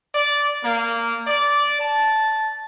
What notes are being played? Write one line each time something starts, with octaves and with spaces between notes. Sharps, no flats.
D5
A#3
D5
A5